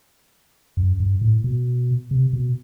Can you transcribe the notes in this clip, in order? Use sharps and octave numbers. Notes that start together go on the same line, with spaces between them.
F#2
G2
A2
B2
C3
B2